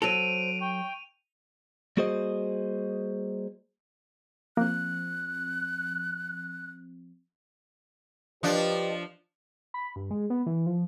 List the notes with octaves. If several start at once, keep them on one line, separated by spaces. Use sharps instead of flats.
F#3 F#4 A4 C5 D7 D#7 F7
G5 C#6
G3 A#3 F#4 G#4 C5 D#5
F3 A#3 C4 F#6
F3 D4 G4 B4 D#5
B5
G2
G#3
B3
E3
F3